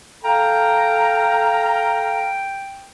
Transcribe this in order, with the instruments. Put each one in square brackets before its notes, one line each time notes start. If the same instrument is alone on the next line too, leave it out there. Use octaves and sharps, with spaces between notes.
[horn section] A4 F5 A#5 [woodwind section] G5